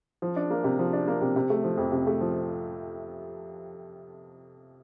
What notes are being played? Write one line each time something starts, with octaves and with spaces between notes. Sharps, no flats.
F3
D4
A#3
C3
F3
D4
A#3
C3
C3
A3
F3
F2
C3
A3
F3